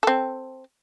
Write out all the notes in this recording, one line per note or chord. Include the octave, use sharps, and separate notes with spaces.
C4 A4